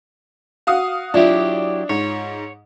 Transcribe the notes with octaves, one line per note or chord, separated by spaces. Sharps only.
F#4 F5 D#6
F#3 D4 E4 F4 G4 E5
G#2 C#5